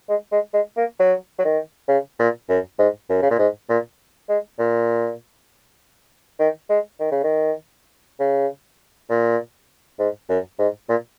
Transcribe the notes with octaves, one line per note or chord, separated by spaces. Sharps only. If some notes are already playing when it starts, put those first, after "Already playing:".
G#3
G#3
G#3
A#3
F#3
F#3
D#3
C#3
A#2
F#2
G#2
F#2
C#3
A#2
G#2
A#2
G#3
A#2
D#3
G#3
D#3
C#3
D#3
C#3
A#2
G#2
F#2
G#2
A#2